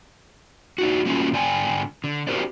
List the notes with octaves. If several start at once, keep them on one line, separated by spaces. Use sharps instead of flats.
D4 D#4 F#4
F#3 G3 A3 A#3 C#4 F4
G#2 D3 D5 G5 G#5
D3
C4 F#4 G4 A#4 C5 D5